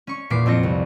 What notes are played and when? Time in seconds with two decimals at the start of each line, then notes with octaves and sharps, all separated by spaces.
0.07 C#4 C#6
0.30 E2 A#2 E3 D6 B6 C7
0.46 F2 C4 F4 A#6 C#7
0.63 C2